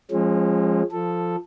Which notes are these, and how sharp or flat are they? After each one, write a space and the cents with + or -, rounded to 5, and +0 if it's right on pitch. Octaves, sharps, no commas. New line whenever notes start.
F3 +0 G#3 -5 C#4 -40
F3 +0 A4 +0